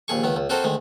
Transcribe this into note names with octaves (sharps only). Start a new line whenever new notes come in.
A#1 D#2 G#4 C#6
C#2 D#3 B3
C#2
C4 F#4 A4 A#4 C5 D#5
D2 D#3 G#3